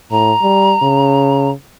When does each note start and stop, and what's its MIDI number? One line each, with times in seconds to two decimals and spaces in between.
0.11 0.32 45
0.11 1.50 82
0.42 0.73 55
0.82 1.52 49